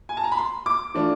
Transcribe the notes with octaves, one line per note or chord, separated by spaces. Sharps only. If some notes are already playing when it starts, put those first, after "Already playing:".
G#5
A5
A#5
B5
C6
D6
E3 A3 D4 F4